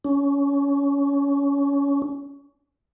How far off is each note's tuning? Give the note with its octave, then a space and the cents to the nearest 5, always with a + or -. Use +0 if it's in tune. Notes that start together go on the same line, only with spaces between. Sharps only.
C#4 +20